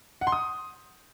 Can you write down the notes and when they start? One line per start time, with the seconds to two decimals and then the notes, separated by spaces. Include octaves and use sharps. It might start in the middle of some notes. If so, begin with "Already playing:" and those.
0.21 F#5
0.27 C6
0.32 D#6